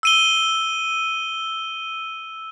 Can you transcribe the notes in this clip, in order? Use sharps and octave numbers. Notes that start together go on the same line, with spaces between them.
E6 D#7 G7